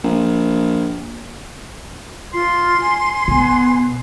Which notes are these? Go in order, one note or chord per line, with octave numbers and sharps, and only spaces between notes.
A#1
F4 C6
G#5
B2 B3